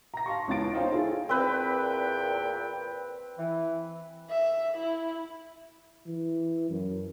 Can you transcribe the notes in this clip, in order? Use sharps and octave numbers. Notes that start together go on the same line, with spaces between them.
A#5 A#6
F5 A5 C6 C#6
C#2 C#3 E3 B3 A6 D7
D#4 F4 C5 C#5 F5 G5
E4 F4 G#4 A4
E2 A#2 C4 B4 G5
E3
E5
E4
E3
F#2